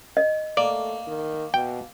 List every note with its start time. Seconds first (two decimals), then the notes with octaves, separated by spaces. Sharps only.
0.17 D#5
0.57 A3 A#3 D5
1.07 D#3
1.54 B2 G5